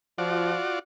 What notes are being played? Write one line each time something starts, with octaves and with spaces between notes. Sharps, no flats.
F3 F4 F#4 D5